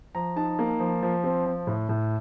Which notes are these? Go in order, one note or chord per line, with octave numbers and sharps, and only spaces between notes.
F3 A#5
D#4 A5
A#3
F3
F3
C4
F3
A2
A2